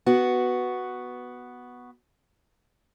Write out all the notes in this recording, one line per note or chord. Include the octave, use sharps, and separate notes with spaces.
B3 F#4